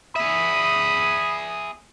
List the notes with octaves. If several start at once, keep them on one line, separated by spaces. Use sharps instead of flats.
G#4 E5 B5 D#6